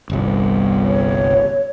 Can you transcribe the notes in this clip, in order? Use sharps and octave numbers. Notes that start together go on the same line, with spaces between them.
G1 C2
C#5